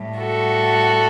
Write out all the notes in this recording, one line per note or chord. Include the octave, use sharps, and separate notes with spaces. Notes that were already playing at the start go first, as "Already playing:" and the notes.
Already playing: A2 G3
F#4 A4